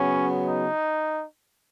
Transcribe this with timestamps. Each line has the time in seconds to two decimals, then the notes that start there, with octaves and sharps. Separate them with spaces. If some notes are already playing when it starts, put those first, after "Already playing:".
Already playing: C#3 F#3 B3 C#4
0.45 D#4